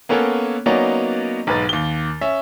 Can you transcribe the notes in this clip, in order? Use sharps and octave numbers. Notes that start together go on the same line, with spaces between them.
A#3 B3 C#4 A4 A#4 C#5
F#3 A#3 B3 C#4 D#4 D5
B1 G#2 B4 A6
D#2 G7
C#4 E5